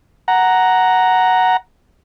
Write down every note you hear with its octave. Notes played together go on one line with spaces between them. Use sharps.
F#5 A#5